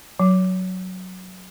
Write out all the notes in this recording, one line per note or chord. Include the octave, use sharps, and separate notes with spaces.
F#3